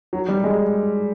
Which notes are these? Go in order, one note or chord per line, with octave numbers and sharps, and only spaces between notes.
F#3
G3
G#3